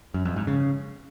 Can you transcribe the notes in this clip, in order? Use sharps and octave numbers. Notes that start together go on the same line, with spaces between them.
F#2
F2
G#2
C#3